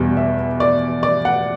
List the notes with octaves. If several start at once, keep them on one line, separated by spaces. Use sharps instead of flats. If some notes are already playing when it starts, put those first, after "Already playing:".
Already playing: E2 B2 G3
E5
D5
D5
F#5